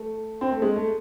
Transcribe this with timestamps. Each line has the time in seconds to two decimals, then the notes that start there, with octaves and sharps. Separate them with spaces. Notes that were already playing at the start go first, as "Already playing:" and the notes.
Already playing: A3
0.41 C4
0.51 A3
0.62 G#3
0.76 A3